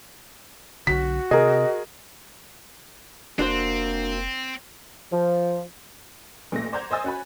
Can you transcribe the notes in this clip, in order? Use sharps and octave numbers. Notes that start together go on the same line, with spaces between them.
B1 D3 F#4 B6
C3 G#4 A#4 D#5
F1 A#3 C4 D4 F#4 C5
F3
A1 A#2 A3 A4 A#6
C5 D5 F#5 A#5 G6 G#6
C5 D#5 G#5 E6 A6
C#4 F#4 G#5 B5